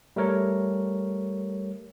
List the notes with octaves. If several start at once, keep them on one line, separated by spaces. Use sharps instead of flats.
G3 A3 A#4 C#5